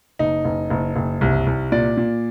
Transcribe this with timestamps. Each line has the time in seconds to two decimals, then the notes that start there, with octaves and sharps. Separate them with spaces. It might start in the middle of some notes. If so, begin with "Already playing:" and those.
0.19 F#1 D#4
0.45 F#1
0.70 F#1
0.96 F#1
1.21 C2
1.47 C2
1.72 A#2 D5
1.97 A#2